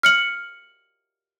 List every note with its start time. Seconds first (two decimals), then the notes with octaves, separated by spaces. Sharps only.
0.03 F6 C#7 F#7